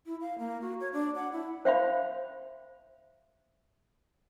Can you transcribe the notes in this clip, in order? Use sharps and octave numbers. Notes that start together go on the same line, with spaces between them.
E4
F5
A#3
F#4
C#5
D4
F#5
E4
C5 E5 F5 B5